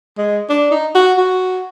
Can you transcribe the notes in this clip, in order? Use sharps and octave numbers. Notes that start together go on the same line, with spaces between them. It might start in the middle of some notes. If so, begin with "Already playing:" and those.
G#3
D4
D#4
F#4
F#4